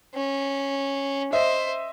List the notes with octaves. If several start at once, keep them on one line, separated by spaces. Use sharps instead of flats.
C#4
C5 D#5 E5